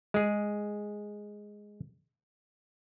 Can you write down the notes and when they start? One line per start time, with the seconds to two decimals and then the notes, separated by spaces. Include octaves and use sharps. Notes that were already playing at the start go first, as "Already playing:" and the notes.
0.14 G#3 G#4